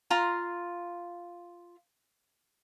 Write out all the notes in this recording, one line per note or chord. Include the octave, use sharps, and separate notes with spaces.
F4 A#5 C6